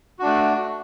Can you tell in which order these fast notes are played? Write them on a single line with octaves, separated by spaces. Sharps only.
F#4 D4 A3